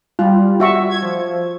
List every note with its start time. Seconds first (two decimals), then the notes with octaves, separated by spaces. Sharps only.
0.19 G3 F4
0.60 F#4 E5 C#6
0.90 G#6
1.03 F3